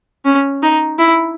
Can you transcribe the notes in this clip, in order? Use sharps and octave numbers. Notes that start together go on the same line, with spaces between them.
C#4
D#4
E4